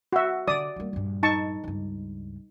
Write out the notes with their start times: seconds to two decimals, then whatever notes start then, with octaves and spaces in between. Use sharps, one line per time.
0.12 F#4 E5
0.48 D3 D5 D#6
0.76 G3 A#3
0.93 A#1 G2
1.23 D#4 A5 C#6
1.64 C#2 G2